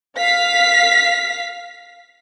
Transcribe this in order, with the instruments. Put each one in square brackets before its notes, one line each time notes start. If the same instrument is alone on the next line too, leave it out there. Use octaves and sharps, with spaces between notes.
[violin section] F5 B6